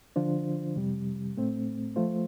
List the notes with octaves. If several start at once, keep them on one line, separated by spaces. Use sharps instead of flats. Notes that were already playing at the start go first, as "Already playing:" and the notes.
D3 F3 D4 F4 C5
F2 C3 G3
A2 A3 C4
F3 A3 F4 C5